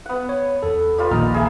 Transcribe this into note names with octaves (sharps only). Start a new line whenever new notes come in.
B3 F#5
C#5
E2 A4
G3 F4 B4
A#1 D#2 D#4 F6
G#4 E5 G#5